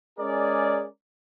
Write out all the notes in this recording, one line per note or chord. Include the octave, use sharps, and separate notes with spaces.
G#3 C#4 G#4 A#4 D5